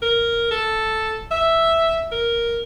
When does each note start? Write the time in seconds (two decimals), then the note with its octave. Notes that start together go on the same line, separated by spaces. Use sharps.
0.02 A#4
0.51 A4
1.31 E5
2.11 A#4